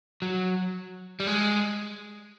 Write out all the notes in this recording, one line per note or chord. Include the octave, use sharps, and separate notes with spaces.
F#3
G3
G#3